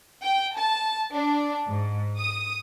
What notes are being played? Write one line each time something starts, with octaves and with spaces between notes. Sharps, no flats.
G5
A5
D4
G#2
D#6